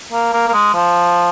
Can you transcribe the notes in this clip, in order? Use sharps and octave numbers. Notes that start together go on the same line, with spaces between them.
A#3
A#3
A#3
G#3
F3